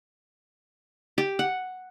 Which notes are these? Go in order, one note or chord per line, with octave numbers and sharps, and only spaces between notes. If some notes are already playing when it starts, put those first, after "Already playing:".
G4
F#5